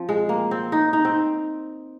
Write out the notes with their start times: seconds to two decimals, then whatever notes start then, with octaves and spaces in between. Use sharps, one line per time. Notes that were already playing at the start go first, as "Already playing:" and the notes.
Already playing: F3 C4
0.09 G#3
0.29 A#3
0.51 C4
0.72 D#4
0.93 D#4
1.05 C4